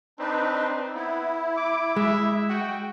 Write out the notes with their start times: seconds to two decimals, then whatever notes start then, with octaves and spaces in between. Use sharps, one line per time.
0.19 C4 D4 D#4 B4
0.95 B3 E4
1.57 D6
1.96 G#3 E5
2.50 F#4 G5